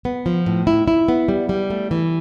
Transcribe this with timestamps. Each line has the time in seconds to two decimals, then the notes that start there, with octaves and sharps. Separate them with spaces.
0.05 B3
0.26 F3
0.46 A2
0.67 E4
0.88 E4
1.08 B3
1.28 G3
1.49 G3
1.70 A3
1.91 E3